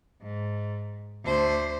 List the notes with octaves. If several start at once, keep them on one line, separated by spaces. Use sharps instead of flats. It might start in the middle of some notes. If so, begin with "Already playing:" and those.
G#2
D2 C5